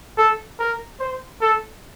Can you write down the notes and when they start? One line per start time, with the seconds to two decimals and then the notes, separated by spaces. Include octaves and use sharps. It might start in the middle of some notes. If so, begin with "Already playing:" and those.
0.17 A4
0.59 A#4
1.00 C5
1.41 A4